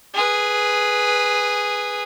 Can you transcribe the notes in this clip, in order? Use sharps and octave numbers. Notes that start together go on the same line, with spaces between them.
G#4 B4